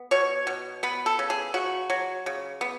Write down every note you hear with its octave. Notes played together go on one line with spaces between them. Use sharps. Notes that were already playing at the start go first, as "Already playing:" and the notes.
Already playing: B3
B2 C#5
B2
B3 B4
A4
C#3
G#4
C#3 F#4
F#3
C#3
B3